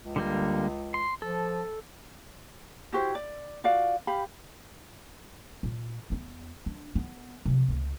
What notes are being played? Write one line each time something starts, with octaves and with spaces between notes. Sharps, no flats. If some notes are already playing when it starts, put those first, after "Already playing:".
C#2
D3 G3 A#3
C6
F3 A4
E4 F#4 G4 C5
D5
F4 F#4 D5 F5
G4 F5 B5
A#2
E2 B3
D4
B3
C3 F3
C#2 A#3